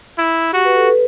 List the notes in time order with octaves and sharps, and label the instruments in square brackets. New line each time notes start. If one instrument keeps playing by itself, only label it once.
[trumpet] E4
[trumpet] F#4 [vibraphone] G4
[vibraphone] B4
A4
B4